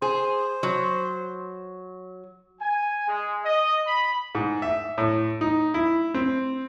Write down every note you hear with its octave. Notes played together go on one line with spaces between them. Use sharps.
G#4 C5
F#3
G#5
G#3
D#5
B5
G#2
E5
A2
D#4
E4
C4